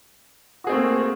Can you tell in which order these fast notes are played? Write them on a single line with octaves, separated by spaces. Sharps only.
F#4 G#4 C4 A3 A#3